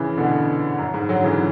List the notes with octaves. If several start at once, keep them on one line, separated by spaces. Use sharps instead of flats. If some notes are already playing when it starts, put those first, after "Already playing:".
Already playing: C#3 E3
B2 D3
F#2
G#2
D3 F#3
C#3 E3